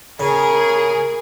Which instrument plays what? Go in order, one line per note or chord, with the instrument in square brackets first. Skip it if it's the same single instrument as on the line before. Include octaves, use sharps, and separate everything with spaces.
[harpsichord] C#3 [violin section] G#4 [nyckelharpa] A#4 C#6